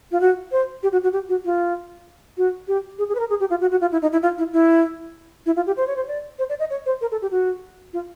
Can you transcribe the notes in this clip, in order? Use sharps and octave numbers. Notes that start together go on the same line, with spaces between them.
F4
F#4
C5
G4
F#4
F#4
G4
F#4
F4
F#4
G4
G#4
G#4
B4
A#4
G#4
G4
F4
F#4
F#4
F4
E4
D#4
E4
F4
E4
E4
E4
F4
G4
C5
C#5
C5
D5
C5
D5
D#5
C#5
C5
A#4
A4
G4
F#4
F4